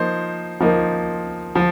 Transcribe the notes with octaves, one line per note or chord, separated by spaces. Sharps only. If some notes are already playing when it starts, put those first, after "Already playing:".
Already playing: F3 A#3 D#4 C5
F3 A#3 D#4
F3